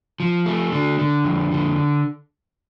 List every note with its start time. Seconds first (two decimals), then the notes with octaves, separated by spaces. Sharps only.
0.20 F3
0.46 A3
0.72 D3
0.99 D3
1.25 F2
1.51 D3